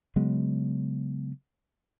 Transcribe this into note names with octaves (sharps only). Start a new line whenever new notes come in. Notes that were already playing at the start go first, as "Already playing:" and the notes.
C#3 F#3 G#3 B3